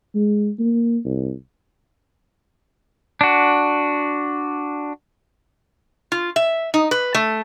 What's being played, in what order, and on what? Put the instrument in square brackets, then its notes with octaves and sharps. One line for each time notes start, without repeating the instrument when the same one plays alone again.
[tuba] G#3
A#3
C2
[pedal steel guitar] D4 F#4
[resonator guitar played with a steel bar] F4
E5
D#4
B4
A3